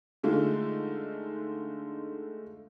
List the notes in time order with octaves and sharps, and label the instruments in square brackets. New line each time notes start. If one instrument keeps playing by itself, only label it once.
[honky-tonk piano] D3 G#3 A3 D#4 F4